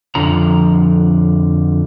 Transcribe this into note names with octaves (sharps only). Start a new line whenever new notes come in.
F2 D3 F3 A#5